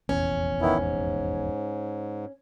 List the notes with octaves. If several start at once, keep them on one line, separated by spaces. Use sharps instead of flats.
F1 A#1 E2 C#4
D#3 B3 E4
G#2